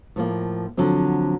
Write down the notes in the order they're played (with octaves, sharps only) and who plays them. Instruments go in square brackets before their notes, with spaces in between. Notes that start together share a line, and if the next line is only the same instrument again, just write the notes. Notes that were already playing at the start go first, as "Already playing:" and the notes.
[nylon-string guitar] A2 F3 A#3
D3 F3 F#3 C4